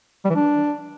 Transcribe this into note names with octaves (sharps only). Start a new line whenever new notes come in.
G3
E3
D4